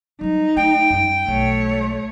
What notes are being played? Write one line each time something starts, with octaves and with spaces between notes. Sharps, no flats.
F#3 G3 D#4
A3 G5
F#2 G3
B1 A3 C#5